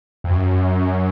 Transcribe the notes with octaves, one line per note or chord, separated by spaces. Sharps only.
F2
F#2